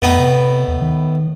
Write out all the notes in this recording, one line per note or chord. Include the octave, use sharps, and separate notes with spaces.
F2 A2 B3 D#4
C3
D#2
D#3